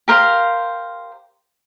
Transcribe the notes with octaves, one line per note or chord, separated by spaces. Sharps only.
G4 A#4 C5 F5